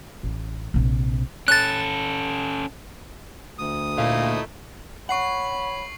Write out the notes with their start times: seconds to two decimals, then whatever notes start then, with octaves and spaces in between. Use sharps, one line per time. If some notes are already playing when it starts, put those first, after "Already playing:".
0.23 A1
0.74 A#1 C3
1.48 C#4 A4 F#6 A6
3.58 D2 D#6
3.98 A#2 A3 D#4 E4 F5
5.09 C#5 F#5 B5 C#6 C7 F#7